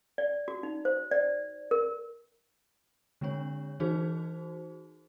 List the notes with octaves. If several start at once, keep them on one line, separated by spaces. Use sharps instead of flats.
D5
F#4
D#4
C5
D5
A#4
D3 G#3 C4 D4 C#5
E3 D#4 F#4 G#4 C5